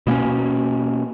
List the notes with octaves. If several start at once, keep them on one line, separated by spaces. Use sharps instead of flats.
B2 A#3 B3 C#4